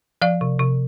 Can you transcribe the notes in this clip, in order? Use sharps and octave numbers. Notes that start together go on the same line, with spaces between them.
F3 D5 F5
C3
C3